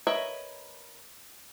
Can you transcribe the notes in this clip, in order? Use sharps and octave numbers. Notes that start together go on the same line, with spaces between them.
A#4 B4 C#5 D#5 E5